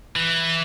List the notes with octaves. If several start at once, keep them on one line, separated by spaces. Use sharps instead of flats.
E3